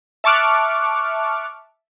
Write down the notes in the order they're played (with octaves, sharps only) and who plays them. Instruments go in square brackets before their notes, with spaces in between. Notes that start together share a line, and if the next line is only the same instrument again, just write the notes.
[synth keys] E5 A5 C#6 D6 F6 F#6